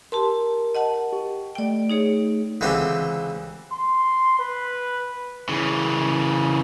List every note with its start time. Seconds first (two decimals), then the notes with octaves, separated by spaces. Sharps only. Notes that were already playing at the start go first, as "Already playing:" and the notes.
0.12 G4 A#4 A5 C6
0.75 D#5 F#5 A5
1.13 G4
1.55 A3 D5 G5 D7
1.90 D#4 G#4 C#5
2.61 C#2 D3 E3 C4 G4
3.72 C6
4.39 B4
5.49 C#3 E3